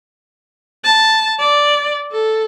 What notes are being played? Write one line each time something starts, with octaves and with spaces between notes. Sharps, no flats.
A5
D5
A4